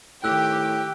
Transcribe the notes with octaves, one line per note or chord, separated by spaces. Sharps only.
A2 D#3 G4 G5 E6 F#6